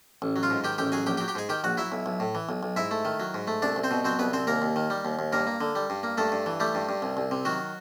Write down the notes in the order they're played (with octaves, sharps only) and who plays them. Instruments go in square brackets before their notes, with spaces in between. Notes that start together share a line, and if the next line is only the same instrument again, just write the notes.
[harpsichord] A1
F#3
F4 F5
G#2
D#3 G4 G5
A1 G4 G5
F#3 G#4 G#5
A#1 G4 G5
G4 G5
F#3
G4 G5
G#2 G#4 G#5
D#3 G4 G5
A#1 F#4 F#5
F#3 E4 E5
B1
B1
A2
E3
B1
B1
G#2 E4 E5
A3
D#3
F#3
G#2
A3
C2 D4 D5
C2
C4 C5
B2
F#3 C4 C5
C2 B3 B4
C2 C4 C5
D#2 A#3 A#4
D#2
D#3
G3
D#2
D#2
G2 A#3 A#4
A#3
D3
G3
G2
A#3
G2 A3 A4
G2
E3
G3 A3 G4
G2
G2
C2
C2
C3
D#3 F#3 F#4